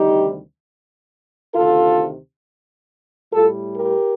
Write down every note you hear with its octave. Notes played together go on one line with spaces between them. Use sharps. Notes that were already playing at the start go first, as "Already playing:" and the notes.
Already playing: D2 C3 D#3 G3 D#4 G4
D2 C3 D#3 F4 A4
A2 G3 F4 A4
G4 A#4